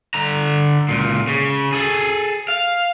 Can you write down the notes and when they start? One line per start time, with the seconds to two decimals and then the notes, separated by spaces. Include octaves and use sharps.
0.14 D3 A#5
0.89 C#2 A#2
1.28 C#3
1.73 G#4 A4
2.48 F5